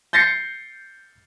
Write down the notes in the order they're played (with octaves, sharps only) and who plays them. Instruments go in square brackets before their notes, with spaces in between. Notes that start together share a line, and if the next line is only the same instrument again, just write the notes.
[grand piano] G6 A6 A#6 C7 C#7